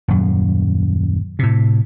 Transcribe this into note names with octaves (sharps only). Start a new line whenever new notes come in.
D#1 F#2
A2 C3